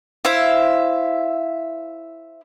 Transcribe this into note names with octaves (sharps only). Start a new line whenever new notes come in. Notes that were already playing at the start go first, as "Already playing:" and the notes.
E4 C5 E5 F5